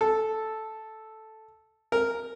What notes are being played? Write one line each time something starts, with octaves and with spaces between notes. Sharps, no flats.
A4
A#4